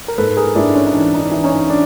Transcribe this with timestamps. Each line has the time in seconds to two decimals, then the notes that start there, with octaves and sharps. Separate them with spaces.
0.08 A#4
0.18 G#2 A4 B4
0.37 G#4 A#4
0.55 G#2 D4 E4
0.75 C#4
0.86 D#4
0.94 E3 D4
1.14 D#4
1.19 D4
1.31 E3
1.44 C#4 D#4
1.70 D4